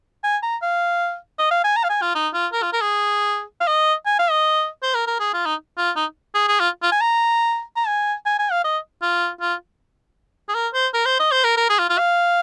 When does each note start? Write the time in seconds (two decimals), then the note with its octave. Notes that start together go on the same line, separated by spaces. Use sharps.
0.24 G#5
0.43 A#5
0.62 F5
1.39 D#5
1.51 F5
1.64 G#5
1.76 A#5
1.84 F5
1.90 G#5
2.02 F4
2.15 D#4
2.34 F4
2.53 A#4
2.63 F4
2.73 A#4
2.81 G#4
3.60 F5
3.67 D#5
4.06 G#5
4.19 F5
4.31 D#5
4.83 C5
4.95 A#4
5.07 A#4
5.20 G#4
5.34 F4
5.46 D#4
5.77 F4
5.96 D#4
6.35 G#4
6.48 G#4
6.60 F4
6.82 F4
6.92 G#5
7.01 A#5
7.76 A#5
7.87 G#5
8.26 G#5
8.39 G#5
8.51 F5
8.64 D#5
9.02 F4
9.41 F4
10.49 G#4
10.55 A#4
10.74 C5
10.94 A#4
11.06 C5
11.19 D#5
11.32 C5
11.44 A#4
11.57 A#4
11.70 G#4
11.79 F4
11.89 F4
11.98 F5